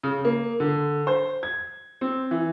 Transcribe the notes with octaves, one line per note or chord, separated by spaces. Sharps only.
C#3
A#3
D3
C5
G#6
C4
E3